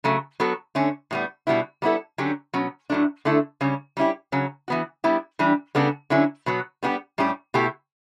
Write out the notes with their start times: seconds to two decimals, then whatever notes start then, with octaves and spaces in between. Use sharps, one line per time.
0.04 C#3 F#3 A3
0.40 F#3 B3 F#4 A4
0.75 D3 A3 C#4
1.11 A2 G3 B3
1.47 B2 G3 B3 E4
1.82 G3 B3 E4 A4
2.18 D3 F#3 C#4 G4
2.53 B2 F#3 C#4
2.90 A2 F#3 A3 D4
3.25 D3 A3 E4 A4
3.61 C#3 G3 C#4
3.97 G3 C#4 E4 G4
4.32 C#3 F#3 C#4
4.68 E3 B3 F#4
5.04 G3 B3 E4 G4
5.39 E3 G3 D4 G4
5.75 C#3 G3 B3 D4 A4
6.10 D3 F#3 C#4 E4
6.46 B2 F#3 B3
6.83 G3 B3 D4 G4
7.18 A2 G3 C#4 G4
7.54 B2 A3 E4 G4